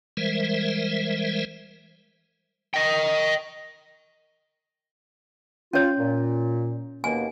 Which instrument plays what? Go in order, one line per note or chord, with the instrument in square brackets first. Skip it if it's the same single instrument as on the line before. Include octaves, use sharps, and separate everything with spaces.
[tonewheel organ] E3 G3 G#3 A#4 C5 E5
[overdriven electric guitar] D#5 G5
[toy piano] C#4 C#5 [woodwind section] F4
[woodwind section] A#2
[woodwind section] D#2 B2 A#3 [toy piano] G#5